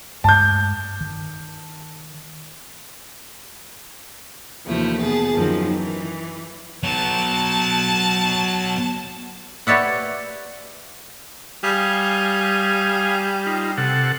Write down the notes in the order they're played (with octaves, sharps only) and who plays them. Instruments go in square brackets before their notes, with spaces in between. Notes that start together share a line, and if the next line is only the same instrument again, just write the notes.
[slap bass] G2 G#3 A3 [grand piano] A5 G6
[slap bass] D#3
[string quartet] D#2 C3 E3 F3 A3 E4
B2 B3 G#4 A5
F#2 D#3 F3 F#3
E3
[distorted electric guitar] F#3 B3 [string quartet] A5
[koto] G4 B4 C#5 D5 E5 F#5
[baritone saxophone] G3 [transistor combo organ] F5 G#5 D#6
[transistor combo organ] D#4 F4
C3 A4 F#5